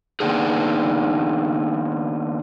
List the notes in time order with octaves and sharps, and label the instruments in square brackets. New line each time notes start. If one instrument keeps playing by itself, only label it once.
[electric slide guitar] D#3 A#3 B3 D4 D#4 G#4